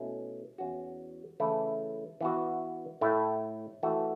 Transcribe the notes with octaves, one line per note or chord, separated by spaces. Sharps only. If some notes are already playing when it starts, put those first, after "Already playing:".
Already playing: B2 A3 C#4 E4
E2 E3 C#4 F#4
C#3 E3 A3 E4
E3 B3 F#4
A2 A3 E4
E3 A3 F#4